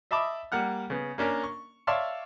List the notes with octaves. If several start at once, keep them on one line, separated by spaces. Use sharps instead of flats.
D#5 E5 A5 B5 D6 D#6
G3 A#3 F#5 F6
C#3 B3
A#3 C#4 D4 A#4
C#6
C#5 D5 E5 F5 A5 C6